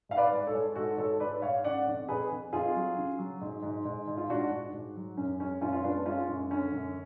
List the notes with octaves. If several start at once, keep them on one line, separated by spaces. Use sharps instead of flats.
G#2 F5
B4 D5
G#3
A4 C#5
G#3
G#2 F#4 A4
G#2 A4 C#5
G#2 B4 D5
G#2 C#5 F5
C#3 D5 F#5
F2
F2 G#4 B4
F2
F2 F4 G#4
F#3
C#3
F#3
G#2
G#2
G#2
G#2
F4
G#2 D4 F#4
G#2
G#2
F#3
F#2 C#4
G#3 C#4
F#2 C#4 F4
F4
G#3 B3 D4
G#3 C#4 F4
F#2
D3 C#4
F#2